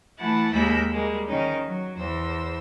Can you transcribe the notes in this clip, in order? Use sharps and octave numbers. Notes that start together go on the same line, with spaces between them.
E3 A3 E4 F#5 A5
D#2 G#3 A#3 B5 E6 G6
G3 G#3 A#3
D#3 C#4 D#4
F#3
E2 C5 E6